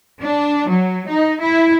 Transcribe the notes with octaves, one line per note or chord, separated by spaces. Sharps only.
D4
F#3
D#4
E4